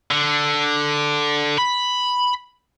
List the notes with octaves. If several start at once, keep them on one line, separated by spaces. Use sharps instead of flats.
D3
B5